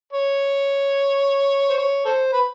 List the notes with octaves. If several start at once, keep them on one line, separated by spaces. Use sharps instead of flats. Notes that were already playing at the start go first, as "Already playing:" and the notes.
C#5
C5
C#5
A4 C5
B4